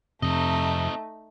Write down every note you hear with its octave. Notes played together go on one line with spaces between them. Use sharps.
F2 C3 A3 C4 D#4 D#5